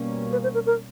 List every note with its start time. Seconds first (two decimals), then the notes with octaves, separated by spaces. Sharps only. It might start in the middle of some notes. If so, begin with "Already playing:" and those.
Already playing: B2 G3 A#3 C#4
0.32 B4
0.43 C5
0.54 A#4
0.66 A#4